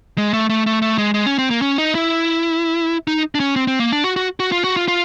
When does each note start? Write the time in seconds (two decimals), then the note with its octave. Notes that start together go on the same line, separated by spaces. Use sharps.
0.18 G#3
0.33 A3
0.49 A3
0.66 A3
0.82 A3
0.98 G#3
1.14 G#3
1.26 C#4
1.39 C4
1.50 A#3
1.62 C#4
1.78 D#4
1.95 E4
3.07 D#4
3.35 D4
3.40 C#4
3.56 C4
3.67 C4
3.80 A#3
3.92 D4
4.04 F#4
4.16 F#4
4.40 F#4
4.52 F4
4.64 F#4
4.77 F4
4.88 F4